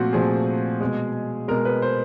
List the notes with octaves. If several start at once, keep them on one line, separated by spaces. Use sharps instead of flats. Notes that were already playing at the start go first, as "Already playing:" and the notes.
Already playing: A#2 F3 A3 C4 F#4
A#2 F3 A3 G#4
B2 G#3
B2 G#3 A#4
B4
C5